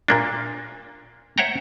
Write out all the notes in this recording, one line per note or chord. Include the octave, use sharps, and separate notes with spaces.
A#2 A#3 D4
C5 C#5 E5 F#5 G5 A#5